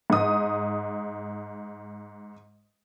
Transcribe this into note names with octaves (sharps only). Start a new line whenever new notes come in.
G#2 D#6